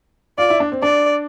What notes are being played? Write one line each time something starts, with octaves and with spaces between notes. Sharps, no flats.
F4 D5
E4
D4
C4
D4 D5